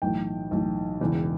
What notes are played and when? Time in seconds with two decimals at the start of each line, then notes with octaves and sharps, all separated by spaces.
0.02 B1 A2 E3 G5
0.51 B1 A2 E3
1.00 E1 E2 C#3 E3